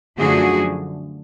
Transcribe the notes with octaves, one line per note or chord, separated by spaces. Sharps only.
F#2 D3 F3 A3 F#4 G#4